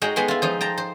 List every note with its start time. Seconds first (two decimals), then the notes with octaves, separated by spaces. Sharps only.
0.02 G#3 D#4 F#4 G5
0.16 G#3 B3 G5 C6
0.28 E4 F4
0.42 F3 D#4 C5
0.61 G5 A5 A#5
0.78 C5